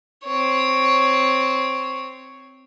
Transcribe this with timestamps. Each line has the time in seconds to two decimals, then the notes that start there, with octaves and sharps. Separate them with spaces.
0.24 C4 C#5